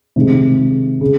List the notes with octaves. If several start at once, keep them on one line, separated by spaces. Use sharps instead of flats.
C3 D#3 G#3
C#3